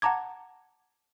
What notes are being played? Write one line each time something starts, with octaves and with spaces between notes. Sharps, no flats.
F#5 A5 A#5 D6 G#6